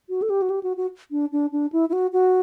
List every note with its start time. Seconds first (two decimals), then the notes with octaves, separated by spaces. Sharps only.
0.09 F#4
0.22 A4
0.30 G4
0.42 F#4
0.50 G4
0.63 F#4
0.77 F#4
1.11 D4
1.32 D4
1.52 D4
1.72 E4
1.89 E4
1.93 F#4
2.13 F#4